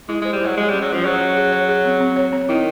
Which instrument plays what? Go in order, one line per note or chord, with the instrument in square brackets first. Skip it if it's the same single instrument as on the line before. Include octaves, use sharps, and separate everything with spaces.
[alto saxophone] G#3 [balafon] E4
[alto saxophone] G#3 [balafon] C5
[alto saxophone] G3
[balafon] E4
[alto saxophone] F#3
[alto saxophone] G#3 [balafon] G#4
[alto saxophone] G3 [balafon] C#4
[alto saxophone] F#3
[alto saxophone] F3 [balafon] C#4
[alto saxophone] F#3 [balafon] G#4
[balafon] C#4
G#4
C#5
G#4
C4
C4
C#5
C4
[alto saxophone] D#3 [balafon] E4